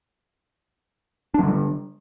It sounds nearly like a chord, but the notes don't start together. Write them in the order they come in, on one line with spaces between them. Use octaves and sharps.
D4 F#3 D3 G3